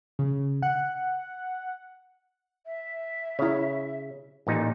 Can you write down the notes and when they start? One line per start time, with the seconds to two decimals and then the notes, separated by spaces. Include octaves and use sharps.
0.19 C#3
0.62 F#5
2.65 E5
3.39 C#3 E4 C#5
4.47 A1 A#2 D#4 G4